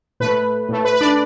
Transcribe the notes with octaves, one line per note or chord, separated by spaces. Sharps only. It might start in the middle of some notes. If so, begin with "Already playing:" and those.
A2 A3 B4
A2 A3
B4
B4
D4 D5